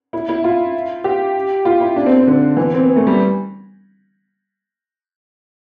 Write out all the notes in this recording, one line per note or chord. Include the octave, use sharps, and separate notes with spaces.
E4
E4
F4
G4
F4
E4
D4
C4
C4
D3
E3
C4
B3
A3
G3